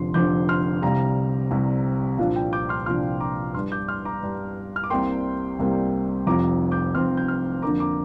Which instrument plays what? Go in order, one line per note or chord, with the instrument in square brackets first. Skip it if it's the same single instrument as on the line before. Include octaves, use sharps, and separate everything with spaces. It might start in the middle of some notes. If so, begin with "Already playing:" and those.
Already playing: [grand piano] F1 F2 D3 F3 C6
F1 F2 D3 F3 D6 G6
C6 F6
C2 C3 G3 F5 A#5
C2 C3 G3
C2 A#2 F3 D4 F5
G5
D6 G6
C6 F6
C2 A#2 F3 D4 C6 F6
A#5 D6
G2 G3 D4 C6 F6
D6 G6
C6 F6
A#5 D6
G2 G3 D4
F6
D6
C2 C3 G3 A#3 G5 C6
C2 C3 G3 A#3
F1 F2 F3 C4 A#5 D6
D6 G6
F1 F2 F3 C4 C6 F6
G6
C6 F6
F2 D3 A#3 D4 A#5 D6
A#5 D6